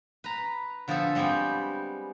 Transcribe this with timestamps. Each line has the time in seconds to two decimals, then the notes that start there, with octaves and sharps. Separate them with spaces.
0.24 B4 A#5
0.88 D3 F3 B3 G#4 A4
1.15 G3 G#3 B3 C4 G4